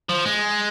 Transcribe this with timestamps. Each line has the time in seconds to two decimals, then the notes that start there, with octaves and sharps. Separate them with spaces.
0.09 F3
0.25 G#3